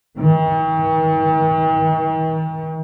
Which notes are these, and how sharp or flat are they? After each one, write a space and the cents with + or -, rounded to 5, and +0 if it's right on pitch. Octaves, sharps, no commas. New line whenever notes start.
D#3 +45